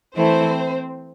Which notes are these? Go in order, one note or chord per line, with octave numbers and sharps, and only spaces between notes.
E3 A3 C4 E4 C5